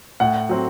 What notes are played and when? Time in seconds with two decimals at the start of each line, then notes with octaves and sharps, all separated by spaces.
0.20 A2 F#5
0.49 F#3 C4